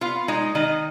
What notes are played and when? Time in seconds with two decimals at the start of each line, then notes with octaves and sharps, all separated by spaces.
0.01 B3 F4 F5
0.28 G#3 D#4 D#5
0.55 D#3 D#4 D#5